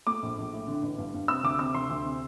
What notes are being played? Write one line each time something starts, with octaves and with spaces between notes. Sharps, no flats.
A3 D6
A#1
A#1
A2
D3
A1
G2
G2
C3 E6
D2 D6
C3 E6
D2 C6
D2
C3